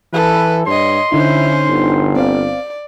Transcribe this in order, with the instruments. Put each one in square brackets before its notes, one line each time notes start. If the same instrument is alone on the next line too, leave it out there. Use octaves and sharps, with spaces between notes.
[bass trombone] E3 [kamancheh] A4 [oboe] B4
[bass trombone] G2 [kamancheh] C#5 D#5 [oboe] C6
[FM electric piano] D3 D#4 [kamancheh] C#4 C5 [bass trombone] E4
[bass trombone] G1
[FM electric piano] C4 F5 [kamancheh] D5